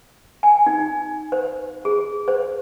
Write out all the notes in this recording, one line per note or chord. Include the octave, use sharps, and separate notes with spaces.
G#5
D#4
C5
G#4
C5